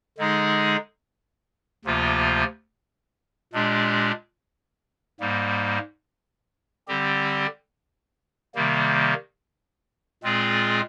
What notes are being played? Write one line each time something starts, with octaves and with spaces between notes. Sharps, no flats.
D3 G#3 D#4 G#4
D2 C3 F3 A#3 F4
A#2 G#3 D4 G4
G#2 G3 A#3
D3 G3 C4 G4
C3 D#3 G3 A#3
A#2 G#3 C4 F4 G#4